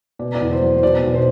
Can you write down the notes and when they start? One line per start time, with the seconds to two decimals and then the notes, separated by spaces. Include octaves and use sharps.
0.19 B2 D5
0.35 D5
0.41 E2
0.51 C5
0.61 F#3
0.76 C5
0.83 B2 D5
1.03 B1
1.14 C5